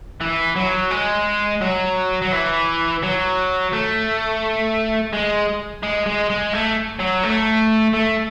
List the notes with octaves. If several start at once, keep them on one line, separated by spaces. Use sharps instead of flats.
E3
F#3
G#3
F#3
F#3
E3
F#3
A3
G#3
G#3
G#3
G#3
A3
F#3
A3
A3